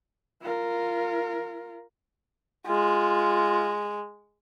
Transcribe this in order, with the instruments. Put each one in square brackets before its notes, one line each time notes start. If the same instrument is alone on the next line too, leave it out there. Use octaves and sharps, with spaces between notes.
[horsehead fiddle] F4 A#4
[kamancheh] G#3 [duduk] F4